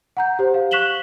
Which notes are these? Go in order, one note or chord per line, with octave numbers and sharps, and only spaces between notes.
F#5 A#5 G6
G4 C5
F5
C#6 F#6 B6 E7 F#7 G7